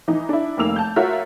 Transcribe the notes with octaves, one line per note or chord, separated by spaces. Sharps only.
E3 D#4
D4 E4
F1 D#3 A#3 F5 E6 F7
A5 G6
F4 F#4 A#4 C#5 E5